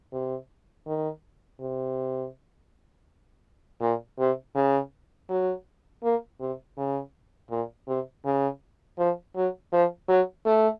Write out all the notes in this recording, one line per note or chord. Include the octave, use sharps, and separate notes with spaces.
C3
D#3
C3
A#2
C3
C#3
F#3
A#3
C3
C#3
A#2
C3
C#3
F3
F#3
F3
F#3
A3